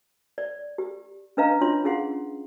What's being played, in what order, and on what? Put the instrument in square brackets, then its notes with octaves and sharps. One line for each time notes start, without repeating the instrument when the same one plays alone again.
[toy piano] D5
G4
C#4 D4 B4 D#5 F5 A#5
D4 F4 C#5 C6
C#4 G#4 F5 F#5 C6